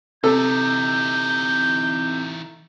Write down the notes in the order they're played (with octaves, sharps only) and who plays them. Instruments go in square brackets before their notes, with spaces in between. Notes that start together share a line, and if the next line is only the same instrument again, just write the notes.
[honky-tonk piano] C3 [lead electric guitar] E3 D#4 [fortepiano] A4 [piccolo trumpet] G6